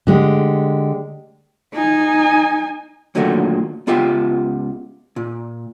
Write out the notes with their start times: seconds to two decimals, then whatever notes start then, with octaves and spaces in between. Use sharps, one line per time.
0.07 D3 G#3 G4
1.74 D#4 G#5
3.15 D#2 A#2 D3 F#3 A3 A#3
3.87 C#2 B3 F4 G4 E5 C6
5.16 A#2